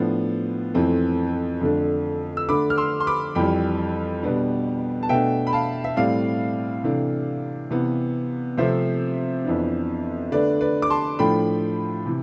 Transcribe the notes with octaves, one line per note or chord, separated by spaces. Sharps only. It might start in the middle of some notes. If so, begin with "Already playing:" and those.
Already playing: A2 F3 B3 D4
F2 E3 A3 C4
F2 D3 A3 D4
E6
D3 A3 D4 B5 D6
F6
C6 E6
C6
B5 D6
F2 E3 G3 G5 B5
B2 G3 B3 D4
A5
B2 A3 D4 E5 G5
B5
F5 A5
E5
A2 G3 C4 D5 F5
C3 E3 A3 D4
C3 E3 B3
C3 F3 A3 C4 C5 E5
F2 E3 B3 D4
D3 A3 D4 B4 D5
B4 D5
D6
A5 C6
A2 F3 A3 D4 G5 B5
C3 E3